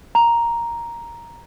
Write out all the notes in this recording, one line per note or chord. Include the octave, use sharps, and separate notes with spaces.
A#5